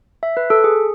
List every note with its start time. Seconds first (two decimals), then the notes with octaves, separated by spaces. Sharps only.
0.23 E5
0.37 B4
0.50 A4
0.64 G#4